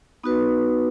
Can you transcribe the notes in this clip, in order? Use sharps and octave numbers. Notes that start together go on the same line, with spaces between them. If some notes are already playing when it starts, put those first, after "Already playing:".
B3 D#4 F#4 B4